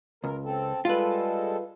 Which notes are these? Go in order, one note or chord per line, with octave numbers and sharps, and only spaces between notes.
C#2 A#4
C4 A4
G3 G#3 F4 A4 B4